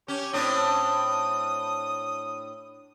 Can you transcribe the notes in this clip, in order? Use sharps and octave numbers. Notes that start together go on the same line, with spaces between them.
C#4 G4 C#5
A2 C4 D4 D#6